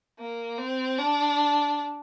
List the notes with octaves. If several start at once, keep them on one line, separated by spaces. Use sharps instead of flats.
A#3
C4
D4